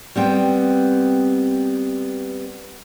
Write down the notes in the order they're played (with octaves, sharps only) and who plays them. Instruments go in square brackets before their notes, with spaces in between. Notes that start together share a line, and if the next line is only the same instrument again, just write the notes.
[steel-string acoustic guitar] G3 B3 C4 G5